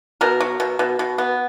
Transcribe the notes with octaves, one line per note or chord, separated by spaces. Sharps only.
B2 A#4
F#3
B2
B2
B2
B3